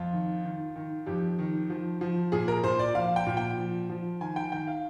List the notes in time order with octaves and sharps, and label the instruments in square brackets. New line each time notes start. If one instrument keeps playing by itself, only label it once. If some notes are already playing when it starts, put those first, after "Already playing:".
Already playing: [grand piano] F2 F4
D#3
D#3
D#3
F2 G4
D#3
F3
F3
A#2 G#4
A#4
A#2 C5
D5
F3 F5
G5
A#2
G5
F3
F3
D#3 G#5
G5
D#3 G5
F5